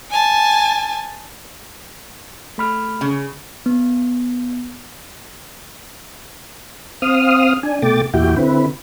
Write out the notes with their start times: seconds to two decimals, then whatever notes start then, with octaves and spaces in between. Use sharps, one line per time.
0.11 G#5 A5
2.58 A3 B5 F6
3.01 C#3
3.66 B3
7.02 C4 F5 D#6 F6
7.63 D4 G#5
7.82 B2 A3 G5 D6 A6
8.14 E2 A#2 E4 F#4 G4 G5
8.36 D3 C4 E4 B4